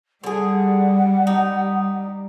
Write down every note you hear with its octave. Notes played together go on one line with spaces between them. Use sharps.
D3 G3 G#4 F#5
D#4